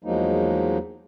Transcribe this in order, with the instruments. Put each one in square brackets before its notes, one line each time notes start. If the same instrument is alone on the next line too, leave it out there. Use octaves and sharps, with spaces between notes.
[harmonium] E2 F3 F#3 G#3 A#3 D#4